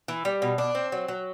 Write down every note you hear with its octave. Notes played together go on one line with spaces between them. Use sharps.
E3
G3
B2
D4
C4
F#3
F#3